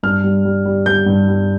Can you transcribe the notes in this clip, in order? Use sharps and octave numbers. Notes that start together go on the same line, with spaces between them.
G2 F6
G3
G3
G3
G3 G6
G2
G3